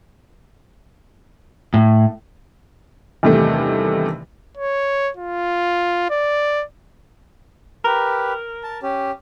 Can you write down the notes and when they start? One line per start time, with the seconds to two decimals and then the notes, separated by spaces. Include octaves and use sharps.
1.74 A2
3.23 E2 G2 C3 D#3 A3
4.58 C#5
5.17 F4
6.10 D5
7.84 G4 A#4 B4
8.63 A5
8.83 C#4 G4